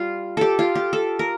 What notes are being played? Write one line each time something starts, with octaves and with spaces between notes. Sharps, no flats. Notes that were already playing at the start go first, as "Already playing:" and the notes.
Already playing: G3 F4 G4
G4 A4
F4
G4
A4
A#4